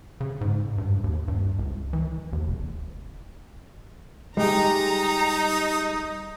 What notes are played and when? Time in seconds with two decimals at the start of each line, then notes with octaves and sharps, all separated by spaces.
0.21 C#3
0.41 G#2
0.78 G2
1.04 D#2
1.28 G2
1.59 C#2
1.93 E3
2.33 D#2
2.48 F1
4.37 G3 G#3 D#4 G4 A#5